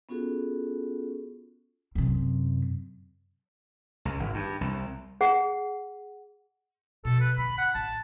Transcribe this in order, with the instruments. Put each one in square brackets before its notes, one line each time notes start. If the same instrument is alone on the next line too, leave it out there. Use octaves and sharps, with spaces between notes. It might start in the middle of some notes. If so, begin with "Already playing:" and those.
[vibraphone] B3 C#4 F4 F#4 G#4 A4
[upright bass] F#2 C3
[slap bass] C#2
G#1
G2
C2
[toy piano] G#4 F#5
[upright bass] B2 F3 [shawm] A4
[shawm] B4
[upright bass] G1 D3 [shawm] B5
[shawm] F#5
[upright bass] A1 [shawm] A5